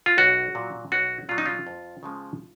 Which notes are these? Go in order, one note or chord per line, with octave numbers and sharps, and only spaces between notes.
F4
B1 F#4
A#2 F#3
B1 F#4
A#2 F#3 F4
D#4
F4
F2
C#3 F3 G#3